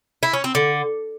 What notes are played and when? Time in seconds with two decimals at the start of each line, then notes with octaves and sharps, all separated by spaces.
0.23 E4
0.33 C#4
0.44 C4
0.55 D3